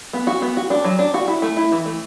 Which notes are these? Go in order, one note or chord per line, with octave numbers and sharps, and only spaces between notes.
B3
F#4
B3
F#4
D4
F#3
D4
F#4
E4
A3
E4
E3
A3